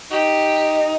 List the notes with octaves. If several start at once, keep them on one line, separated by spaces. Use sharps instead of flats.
D#4 G4